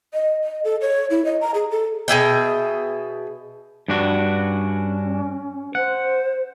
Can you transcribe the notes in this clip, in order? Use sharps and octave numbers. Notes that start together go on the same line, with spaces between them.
D#5
D#5
A4
C#5
E4
D#5
A#5
G#4
A4
B2 G#4 E5 G5
G2 D4 F#4
C#4
C5 F#5